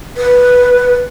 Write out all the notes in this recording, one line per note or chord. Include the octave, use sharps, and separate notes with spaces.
B4